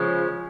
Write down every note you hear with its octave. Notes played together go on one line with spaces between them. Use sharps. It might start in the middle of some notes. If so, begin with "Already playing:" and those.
Already playing: C#3 F3 G#3 C#4